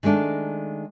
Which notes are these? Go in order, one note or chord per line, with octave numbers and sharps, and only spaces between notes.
D#3 G#3 A3 D4 A4